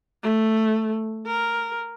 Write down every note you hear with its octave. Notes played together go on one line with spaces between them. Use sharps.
A3
A#4